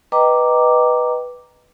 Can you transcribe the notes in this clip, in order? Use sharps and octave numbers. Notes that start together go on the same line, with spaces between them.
B4 D#5 G5 A#5 D6